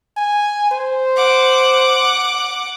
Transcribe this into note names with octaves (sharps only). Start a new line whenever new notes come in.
G#5
C5
F#5 D6